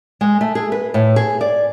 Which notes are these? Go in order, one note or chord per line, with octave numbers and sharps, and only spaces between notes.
G#3
A3
G#4
B4
A2
G#4
D5